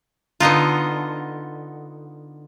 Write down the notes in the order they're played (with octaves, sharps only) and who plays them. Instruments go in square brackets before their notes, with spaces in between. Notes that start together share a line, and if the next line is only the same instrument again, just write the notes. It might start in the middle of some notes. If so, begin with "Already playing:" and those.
[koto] D3 B3 D#4 F4